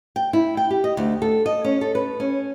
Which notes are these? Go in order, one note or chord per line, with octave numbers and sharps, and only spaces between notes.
G5
E4
G5
G4
D#5
D2
A4
D#5
C#4
A4
B4
C#4